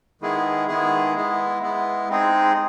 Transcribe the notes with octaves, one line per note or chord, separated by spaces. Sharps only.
D#3 G#3 B3 E4 G#4
D#3 G#3 B3 E4 G#4
G#3 B3 E4
G#3 B3 E4
G#3 C4 D#4 G#4